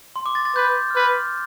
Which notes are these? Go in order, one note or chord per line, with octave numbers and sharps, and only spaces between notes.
C6
D6
A6
A6
B4 G6
F6
B4 G6